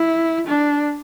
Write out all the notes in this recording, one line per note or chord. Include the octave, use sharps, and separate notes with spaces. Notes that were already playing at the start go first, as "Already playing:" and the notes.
Already playing: E4
D4